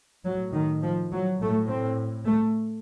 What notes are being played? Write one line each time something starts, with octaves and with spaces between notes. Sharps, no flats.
A2 F#3
D#3
F3
F#3
A2 A3
C4
A3